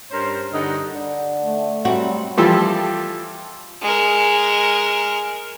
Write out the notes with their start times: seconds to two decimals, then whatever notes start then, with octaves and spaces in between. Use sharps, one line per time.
0.11 G2 C#4 A#4 C5
0.53 G2 D3 D#4 D#5 F#5
0.95 D3
1.41 A3
1.85 F#3 G3 C4 F#4
2.37 E3 F3 G3 F4 G4 A4
3.82 G#3 A#4